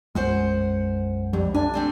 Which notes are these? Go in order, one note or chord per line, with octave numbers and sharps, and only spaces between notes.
B1 F#2 G#3 C5 F#5 G#5
F2 G3
D4 G#5
A3 C4 G#5